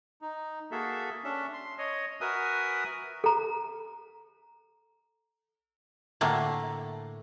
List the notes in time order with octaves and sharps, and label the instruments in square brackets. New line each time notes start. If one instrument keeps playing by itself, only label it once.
[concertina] D#4
A#3 F#4 G#4 A4 E5
C#4 D4 E5
C6
C#5 D#5
F#4 A#4 B4 E5 G#5 D#6
[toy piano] A4 A#5
[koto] A2 D3 A3 A#3